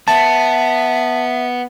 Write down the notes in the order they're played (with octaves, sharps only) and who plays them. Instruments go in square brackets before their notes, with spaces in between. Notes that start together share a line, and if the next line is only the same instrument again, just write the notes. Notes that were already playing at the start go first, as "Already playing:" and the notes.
[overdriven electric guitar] B3 [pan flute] E5 [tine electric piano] A5